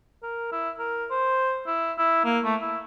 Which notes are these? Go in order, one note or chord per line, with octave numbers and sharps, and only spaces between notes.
A#4
E4
A#4
C5
E4
E4
A#3
A3
E4